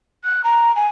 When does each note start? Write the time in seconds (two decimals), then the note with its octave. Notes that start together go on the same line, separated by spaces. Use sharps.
0.24 F#6
0.44 A#5
0.76 G#5